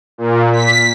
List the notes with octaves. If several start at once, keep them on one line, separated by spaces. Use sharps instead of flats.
A#2
B6